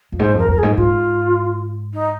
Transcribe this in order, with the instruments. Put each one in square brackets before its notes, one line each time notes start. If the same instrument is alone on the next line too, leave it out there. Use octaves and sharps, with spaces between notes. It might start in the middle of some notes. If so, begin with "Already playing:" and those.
[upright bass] F2
[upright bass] G#2 [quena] C5
[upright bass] F2 [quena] A#4
[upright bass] F2 [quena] A#4
[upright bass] G#2 [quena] G#4
[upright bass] G#2 [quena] F4
[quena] D#4